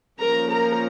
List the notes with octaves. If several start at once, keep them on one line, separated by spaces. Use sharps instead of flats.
F3 A#3 C#4 A#4 A#5
A#4 A#5